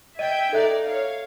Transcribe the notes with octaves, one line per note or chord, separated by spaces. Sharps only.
D#5 E5 G5 G#6 D#7
D#4 A4 D5 E5 F#6
C#5 F5